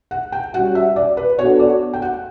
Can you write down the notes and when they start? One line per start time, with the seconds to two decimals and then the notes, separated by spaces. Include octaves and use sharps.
0.11 F#5
0.32 G5
0.54 G3 C#4 F#4 F#5
0.75 E5
0.96 D5
1.17 B4
1.39 B3 D4 F#4 A4 C#5
1.59 D5
1.93 G5
2.02 F#5